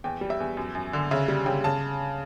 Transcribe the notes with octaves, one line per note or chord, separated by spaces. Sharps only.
E2 G5
G3
E5
E2
F#2
F#2
D3
C#3 E5
G3
C#3 G5
C#3 A5